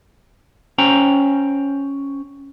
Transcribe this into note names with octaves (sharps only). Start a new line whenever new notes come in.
C#4 C5 G5 A#5